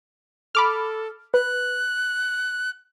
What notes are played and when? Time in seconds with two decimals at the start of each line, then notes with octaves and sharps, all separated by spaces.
0.55 A4 B5 D6 F6
1.34 B4 F#6